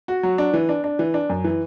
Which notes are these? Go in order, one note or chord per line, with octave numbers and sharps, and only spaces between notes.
F#4
F#3
D4
E3
D4
D4
E3
D4
F#2
E3